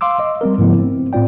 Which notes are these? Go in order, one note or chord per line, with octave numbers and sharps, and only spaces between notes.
F5 C6 D6 E6
D#5
G3 C4 A#4
G#2 C#3 F3 A3 B3 E4
C4
A2 C4 F4 D5 G5